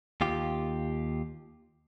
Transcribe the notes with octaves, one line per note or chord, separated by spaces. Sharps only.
D#2 F4 G4